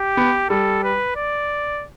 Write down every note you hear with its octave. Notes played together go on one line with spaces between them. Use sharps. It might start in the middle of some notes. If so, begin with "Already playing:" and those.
Already playing: G4
B3
G3 A4
B4
D5